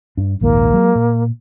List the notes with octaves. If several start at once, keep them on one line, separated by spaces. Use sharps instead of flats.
G2 D4
A#1 D#2 G#2 A#3
F#3 G#3
A#2